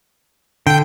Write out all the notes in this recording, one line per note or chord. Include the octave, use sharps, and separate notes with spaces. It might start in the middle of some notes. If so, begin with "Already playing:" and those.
D3 G5